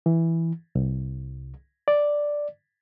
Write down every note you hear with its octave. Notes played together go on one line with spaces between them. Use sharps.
E3
C2
D5